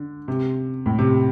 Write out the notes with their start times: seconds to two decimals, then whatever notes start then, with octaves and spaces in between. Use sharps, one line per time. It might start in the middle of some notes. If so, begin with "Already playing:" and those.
Already playing: D3
0.28 C3
0.86 A2
0.99 C3